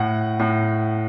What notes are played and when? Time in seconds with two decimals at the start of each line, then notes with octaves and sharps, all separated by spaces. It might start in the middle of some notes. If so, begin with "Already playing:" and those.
Already playing: A2 F#5
0.40 A2